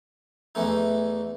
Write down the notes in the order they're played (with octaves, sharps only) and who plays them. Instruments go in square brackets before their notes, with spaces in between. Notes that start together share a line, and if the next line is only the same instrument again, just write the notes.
[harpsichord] E2 E3 A3 D#4